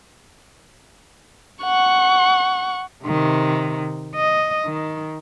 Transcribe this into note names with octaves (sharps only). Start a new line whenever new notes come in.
F#5 C#6
C3 D#3
D#5
D#3